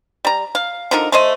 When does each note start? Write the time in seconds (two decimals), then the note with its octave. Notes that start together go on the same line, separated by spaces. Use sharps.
0.25 G3 A#5
0.55 F5
0.91 D3 F3 D#4 A#4
1.12 A3 C5 D#5